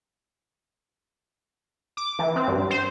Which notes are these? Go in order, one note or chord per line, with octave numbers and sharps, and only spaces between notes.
D6
E3
C4
G2
C5